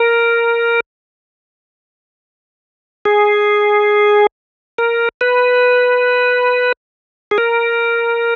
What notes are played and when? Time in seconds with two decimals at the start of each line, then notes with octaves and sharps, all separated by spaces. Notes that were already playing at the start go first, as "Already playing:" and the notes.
Already playing: A#4
3.05 G#4
4.78 A#4
5.21 B4
7.31 G#4
7.38 A#4